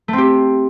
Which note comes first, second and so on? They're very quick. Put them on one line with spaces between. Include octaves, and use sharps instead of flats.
A3 C4 G4